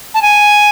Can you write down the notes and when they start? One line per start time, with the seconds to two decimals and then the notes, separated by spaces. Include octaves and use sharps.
0.14 A5
0.22 G#5